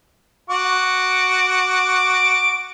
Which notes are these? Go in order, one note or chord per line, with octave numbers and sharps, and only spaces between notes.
F#4 D6